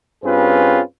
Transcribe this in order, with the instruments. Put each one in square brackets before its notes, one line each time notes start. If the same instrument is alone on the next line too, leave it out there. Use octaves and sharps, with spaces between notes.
[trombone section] G2 C4 C#4 F4 G#4 B4